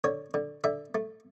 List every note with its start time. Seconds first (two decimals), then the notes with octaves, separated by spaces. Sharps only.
0.04 D3 C#5
0.34 D3
0.64 D3 E5
0.95 A3